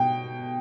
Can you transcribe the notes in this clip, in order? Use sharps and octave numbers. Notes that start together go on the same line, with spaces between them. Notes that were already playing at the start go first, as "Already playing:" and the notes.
Already playing: B2 G5